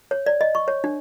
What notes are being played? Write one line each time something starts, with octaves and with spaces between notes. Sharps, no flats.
C#5
D5
D#5
C#6
C#5
D4